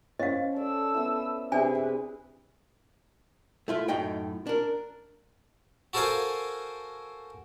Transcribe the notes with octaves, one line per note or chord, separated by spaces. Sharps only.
C#4 C5 C#5 D#5 F5
A4 D5 E6
B3 E4
C3 D4 G#4 B4 D5 E5 G#5
A3 E4 F4
F#2 A2 D#4 G5
D4 A#4
F#4 A4 A#4 C5 F5 G#5